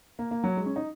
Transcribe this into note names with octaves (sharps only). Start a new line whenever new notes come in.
A#3
A#3
F#3
G#3
C#4
D#4